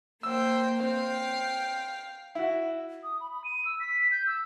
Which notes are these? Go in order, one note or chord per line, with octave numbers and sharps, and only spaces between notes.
A#3 C5 G5 E6
C4 F5 G5
E4 F#4
D#6
B5
B5
D#7
E6
B6
G6
E6